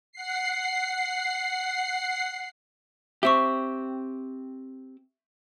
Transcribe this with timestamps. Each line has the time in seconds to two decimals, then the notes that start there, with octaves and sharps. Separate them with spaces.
0.12 F#5 C7
3.23 C4 G4 E5 C#6